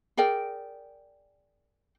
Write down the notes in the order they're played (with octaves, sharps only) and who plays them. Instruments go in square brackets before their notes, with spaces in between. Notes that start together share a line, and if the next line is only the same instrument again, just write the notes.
[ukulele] G#4 A#4 D5 G5